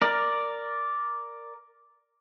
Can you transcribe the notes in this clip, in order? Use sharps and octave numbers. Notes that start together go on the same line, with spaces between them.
A#4 D5